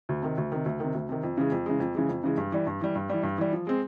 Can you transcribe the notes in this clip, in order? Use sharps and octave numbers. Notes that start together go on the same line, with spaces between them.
D2
C3 D#3
D2
C3 D#3
D2
C3 D#3
D2
C3 D#3
F2
C#3 E3 G#3
F2
C#3 E3 G#3
F2
C#3 E3 G#3
F2
C#3 E3 G#3
G2
E3 G3
G2
E3 G3
G2
E3 G3
G2
E3 G3
F3
G#3 C4